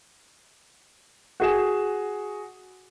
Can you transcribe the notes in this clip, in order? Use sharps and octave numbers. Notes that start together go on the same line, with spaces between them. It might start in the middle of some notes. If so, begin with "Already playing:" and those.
F#4 G#4 E7